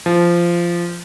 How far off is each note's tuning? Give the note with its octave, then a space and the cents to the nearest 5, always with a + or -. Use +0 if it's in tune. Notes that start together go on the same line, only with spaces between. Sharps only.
F3 -15